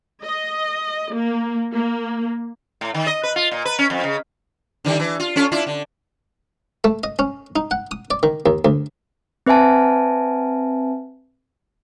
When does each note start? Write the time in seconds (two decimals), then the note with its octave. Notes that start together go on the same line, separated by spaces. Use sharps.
0.25 D#5
1.13 A#3
1.73 A#3
2.81 A2
2.94 D#3
3.07 D#5
3.23 B4
3.36 F4
3.51 A#2
3.65 B4
3.79 C#4
3.90 F2
4.03 C#3
4.85 D3 D#3 G3
4.99 E3
5.20 F4
5.36 C#4 F4 A4
5.51 D4 E4 F4
5.67 D3
6.84 A3
7.04 D#5
7.19 C#4
7.56 D#4
7.71 F#5
7.91 D#6
8.11 D5
8.23 D#3
8.46 D#2
8.65 D2
9.46 C4 B4 E5 G#5 A5